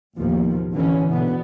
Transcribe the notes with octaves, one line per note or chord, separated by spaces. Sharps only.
A1 D#2 B2 F3
D3 E3 C#4
B2 D3 B3